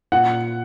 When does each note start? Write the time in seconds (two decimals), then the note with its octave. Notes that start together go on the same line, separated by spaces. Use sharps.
0.12 A#2 F#5